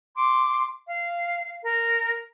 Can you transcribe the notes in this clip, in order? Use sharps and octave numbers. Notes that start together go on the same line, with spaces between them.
C6 D6
F5
A#4